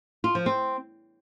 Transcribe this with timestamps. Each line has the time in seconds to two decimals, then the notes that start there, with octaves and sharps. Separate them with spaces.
0.24 F4
0.35 F3
0.46 C4